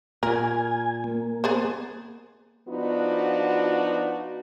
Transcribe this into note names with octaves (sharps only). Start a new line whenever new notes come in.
A#2 A#4 G#5
A#3
B3 G#4 C5
F3 B3 D4 D#4 F4 F#4